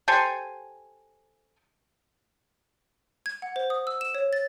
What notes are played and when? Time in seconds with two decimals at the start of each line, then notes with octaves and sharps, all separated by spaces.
0.08 G4 A4 C5 G#5
3.26 G#6
3.42 F#5
3.56 C5
3.70 D#6
3.87 E6
4.01 E7
4.15 C#5
4.33 A6